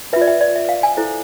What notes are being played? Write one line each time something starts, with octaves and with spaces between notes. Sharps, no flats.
F4 B4 E5
D5
E5
D5
E5
F5
G#5
E4 A4 C5